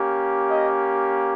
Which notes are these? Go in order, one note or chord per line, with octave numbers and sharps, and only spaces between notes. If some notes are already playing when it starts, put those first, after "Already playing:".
Already playing: A#3 C#4 G4
D#5